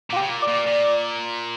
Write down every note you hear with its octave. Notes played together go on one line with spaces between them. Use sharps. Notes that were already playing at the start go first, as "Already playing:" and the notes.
A#2 F4
G4
C#3
A#2
D5
A#2
A#2